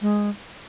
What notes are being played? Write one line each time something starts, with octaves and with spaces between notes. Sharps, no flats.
G#3